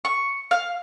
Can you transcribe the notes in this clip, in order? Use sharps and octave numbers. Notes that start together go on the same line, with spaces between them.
C#6
F5